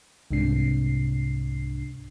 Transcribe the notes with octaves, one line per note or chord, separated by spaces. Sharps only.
C2 G#2 C3 D4 C7